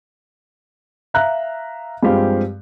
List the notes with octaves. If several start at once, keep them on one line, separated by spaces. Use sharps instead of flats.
E5 F5 A#5 F#6
G2 F3 G#3 C4 G4 F5